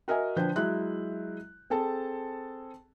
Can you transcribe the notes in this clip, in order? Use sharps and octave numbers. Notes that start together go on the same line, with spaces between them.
F#4 A#4 D#5 E5 G#5
D3 F3 B4 C5 G5 G6
F#3 G#3 E4 E5 F#6
C4 G#4 A4 A5